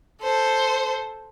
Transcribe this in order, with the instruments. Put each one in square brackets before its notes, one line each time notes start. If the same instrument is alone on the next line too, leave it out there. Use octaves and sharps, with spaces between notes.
[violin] A4 C5